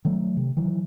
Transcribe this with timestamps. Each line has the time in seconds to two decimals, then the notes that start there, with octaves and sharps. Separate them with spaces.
0.05 D#3 F#3 A3
0.37 C3
0.57 D#3 E3 F#3